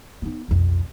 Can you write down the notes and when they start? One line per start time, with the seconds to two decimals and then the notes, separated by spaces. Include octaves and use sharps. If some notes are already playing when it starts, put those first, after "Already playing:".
0.22 B3 D#4
0.48 B1 F2